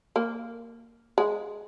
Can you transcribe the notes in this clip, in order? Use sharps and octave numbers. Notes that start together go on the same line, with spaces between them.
A#3
G#3